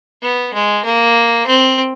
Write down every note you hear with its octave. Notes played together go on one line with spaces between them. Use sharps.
B3
G#3
A#3
C4